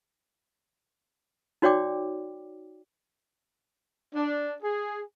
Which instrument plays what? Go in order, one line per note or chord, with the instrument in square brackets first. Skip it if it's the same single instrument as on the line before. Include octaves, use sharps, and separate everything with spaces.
[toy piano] D#4 F#4 C#5 D5 G5 D6
[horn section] D4
G#4